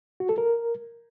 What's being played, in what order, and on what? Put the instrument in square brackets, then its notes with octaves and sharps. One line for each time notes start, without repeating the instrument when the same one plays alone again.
[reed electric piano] F#4
A4
A#4